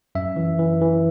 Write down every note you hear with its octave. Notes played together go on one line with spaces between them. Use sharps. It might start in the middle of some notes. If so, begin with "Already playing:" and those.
F#2 E5
E3
E3
E3